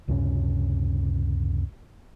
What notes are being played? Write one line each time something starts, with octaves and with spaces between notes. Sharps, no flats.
C#2 F#2 C3 C#4